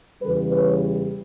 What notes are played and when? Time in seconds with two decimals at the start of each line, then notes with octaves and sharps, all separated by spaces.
0.22 E2 C#3 E3 G3 A4 B4
0.52 B4 C#5